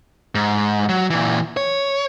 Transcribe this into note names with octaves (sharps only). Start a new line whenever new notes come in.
G#2
F#3
A#2 E3
C#5